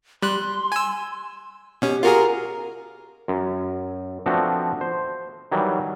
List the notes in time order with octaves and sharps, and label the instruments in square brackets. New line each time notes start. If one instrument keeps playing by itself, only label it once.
[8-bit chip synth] G3 F#6 [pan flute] C6
[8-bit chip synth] G#5 E6
[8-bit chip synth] B2 C#4 [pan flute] G4
[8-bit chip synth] F4 F#4 G#4 [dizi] A#4
[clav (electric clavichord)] F#2
F3 A3 B3 C4 D4 F#4
C5
D#3 E3 F#3 G3